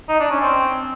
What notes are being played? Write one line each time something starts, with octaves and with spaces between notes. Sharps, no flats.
D#4
D4
C#4
C4